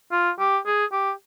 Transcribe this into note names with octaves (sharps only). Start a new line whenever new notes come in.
F4
G4
G#4
G4